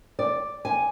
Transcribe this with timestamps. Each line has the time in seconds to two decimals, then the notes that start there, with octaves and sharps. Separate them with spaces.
0.19 D5
0.65 G#5